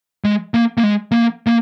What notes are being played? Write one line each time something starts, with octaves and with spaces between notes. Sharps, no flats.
G#3
A#3
A#3
G#3
A#3
A#3